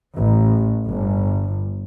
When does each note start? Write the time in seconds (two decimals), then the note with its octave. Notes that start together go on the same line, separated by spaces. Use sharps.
0.16 A1
0.89 G1